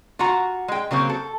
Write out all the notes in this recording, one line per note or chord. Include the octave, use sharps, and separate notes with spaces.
F4 F#4 F#5 A#5
G#3 G5
C#3 F#3 A#3 C4
A4